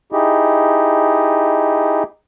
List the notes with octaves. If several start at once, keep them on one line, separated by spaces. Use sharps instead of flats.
D#4 E4 G4 G#4 D#5